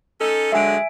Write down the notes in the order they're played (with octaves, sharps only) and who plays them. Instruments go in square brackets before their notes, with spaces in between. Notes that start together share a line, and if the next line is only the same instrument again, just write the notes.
[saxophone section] C#4 D#4 A4
[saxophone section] D3 F#3 G#3 [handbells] E5 G#5 D7